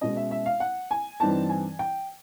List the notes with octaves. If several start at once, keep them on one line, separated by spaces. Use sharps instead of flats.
B2 G#3 C#4 D#5
E5
E5
F5
F#5
G#5
G2 E3 G3 C4 D#4 A5
G#5
G5